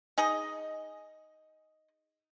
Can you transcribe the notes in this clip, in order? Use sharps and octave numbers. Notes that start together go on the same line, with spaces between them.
D#4 G#4 D#5